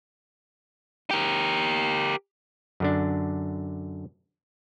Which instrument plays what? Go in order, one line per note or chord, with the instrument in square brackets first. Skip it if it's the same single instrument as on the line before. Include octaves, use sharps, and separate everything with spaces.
[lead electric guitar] G4 A#4
[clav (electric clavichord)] F#2 D3 D4